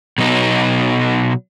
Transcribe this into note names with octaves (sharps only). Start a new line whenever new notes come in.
B2 F#3 B3 D#4